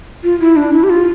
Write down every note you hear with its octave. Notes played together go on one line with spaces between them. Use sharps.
F4
E4
D4
E4
G4
F4